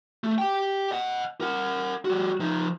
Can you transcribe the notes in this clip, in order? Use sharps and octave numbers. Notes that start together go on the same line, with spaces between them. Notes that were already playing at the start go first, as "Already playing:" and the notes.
A3
G4 G5
D#5 F#5
A#4 F#5
G3 F#4
F3 D#4